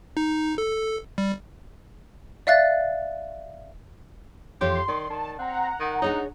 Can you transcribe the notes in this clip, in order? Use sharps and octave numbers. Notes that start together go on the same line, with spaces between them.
D#4
A4
G3
D5 E5 F5 F#6 A6
F2 E3 G4 C#5 C6
D#3 D5
D#3 A5
C4 F#5 A#5
D#3
D4 D#4 G#4 C#5